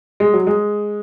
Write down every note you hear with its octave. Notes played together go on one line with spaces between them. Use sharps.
G#3
F#3
G#3